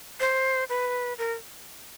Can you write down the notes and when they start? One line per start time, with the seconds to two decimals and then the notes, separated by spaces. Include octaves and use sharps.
0.20 C5
0.69 B4
1.18 A#4